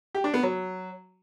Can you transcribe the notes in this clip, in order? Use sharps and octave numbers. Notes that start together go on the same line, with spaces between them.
G4
D4
B3
F#3